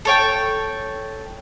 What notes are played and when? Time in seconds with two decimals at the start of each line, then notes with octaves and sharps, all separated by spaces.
0.05 A4 C#5 G5